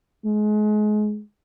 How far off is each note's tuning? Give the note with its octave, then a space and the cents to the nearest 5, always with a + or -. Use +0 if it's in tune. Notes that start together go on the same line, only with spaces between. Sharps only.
G#3 +30